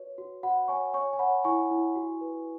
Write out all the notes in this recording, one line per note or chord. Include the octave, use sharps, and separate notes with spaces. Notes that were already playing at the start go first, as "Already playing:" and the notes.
Already playing: F#4 B4 C#5
F#4
F#4 F#5 B5
C#5 G#5 C#6
C#5 G#5 C#6
G#5
C#5 F#5 B5
E4 G#5 C#6
E4
F#4
B4